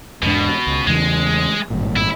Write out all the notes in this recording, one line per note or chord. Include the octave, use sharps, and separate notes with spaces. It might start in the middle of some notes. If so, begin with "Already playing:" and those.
E2 G#2 B2 D4
C#2
E2 C#3 E3 G#3
G#1 G2 A#2
E4